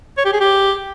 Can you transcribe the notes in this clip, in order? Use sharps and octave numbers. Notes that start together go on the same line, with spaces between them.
C#5
G4
G#4
G4